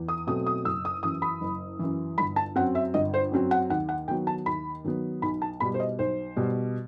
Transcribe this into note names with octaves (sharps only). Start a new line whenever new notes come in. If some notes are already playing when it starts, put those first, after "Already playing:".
Already playing: E2
D#6
B2 F#3 A3 C4 D#6
D#6
F#1 E6
D#6
F#2 E3 D#6
B5
F#1
F#2 E3
G1 B5
A5
F#2 F#3 C4 F#5
E5
G1 D#5
C5
F#2 F#3 C4
F#5
D#2 F#5
F#5
D#3 F#3 B3 G5
A5
D#2 B5
D#3 F#3 B3
B1 B5
A5
B2 G3 B5
C5
D#5
B1 C5
B2 G3